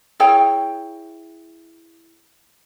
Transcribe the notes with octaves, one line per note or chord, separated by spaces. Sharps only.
E4 G#4 C#5 G5